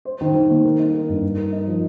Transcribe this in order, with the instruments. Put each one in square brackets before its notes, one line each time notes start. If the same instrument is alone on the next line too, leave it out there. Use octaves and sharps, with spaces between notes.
[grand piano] C5
D#3
D#3
A#3
A#4
D#4
A#4
G2
D#4
A#4
D#4
F3